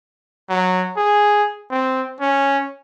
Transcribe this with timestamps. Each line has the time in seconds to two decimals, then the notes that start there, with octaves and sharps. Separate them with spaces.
0.49 F#3
0.97 G#4
1.71 C4
2.21 C#4